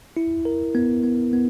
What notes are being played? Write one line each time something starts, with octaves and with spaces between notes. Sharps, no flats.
E4
A#4
B3
B3
B3